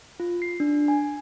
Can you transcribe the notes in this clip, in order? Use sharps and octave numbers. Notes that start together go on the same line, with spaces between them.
F4
C7
D4
G#5